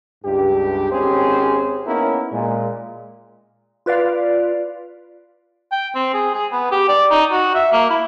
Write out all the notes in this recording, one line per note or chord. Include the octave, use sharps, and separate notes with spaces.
C#2 G2 G4
G#1 C4 C#4 G4 G#4 C5
A#3 B3 C#4 D#4 E4 A#4
A#2 G#3
F4 B4 D5 F5
G5
C4
G#4
G#4
B3
G4
D5
D#4
F#4
E5
A#3
E4